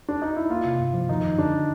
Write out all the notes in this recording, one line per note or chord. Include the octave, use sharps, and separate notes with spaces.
D4
D#4
E4
A#3 F4
C3
G2
F3
D#3 D#4
F#2
D3 D4
D3